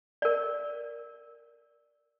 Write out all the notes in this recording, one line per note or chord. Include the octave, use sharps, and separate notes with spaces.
A#4 D5